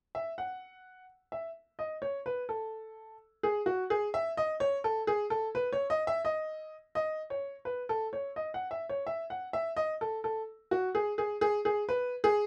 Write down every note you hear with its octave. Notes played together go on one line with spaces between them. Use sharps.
E5
F#5
E5
D#5
C#5
B4
A4
G#4
F#4
G#4
E5
D#5
C#5
A4
G#4
A4
B4
C#5
D#5
E5
D#5
D#5
C#5
B4
A4
C#5
D#5
F#5
E5
C#5
E5
F#5
E5
D#5
A4
A4
F#4
G#4
G#4
G#4
G#4
B4
G#4